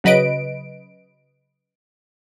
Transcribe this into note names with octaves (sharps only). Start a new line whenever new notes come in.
C#3 F#3 B4 D#5 D7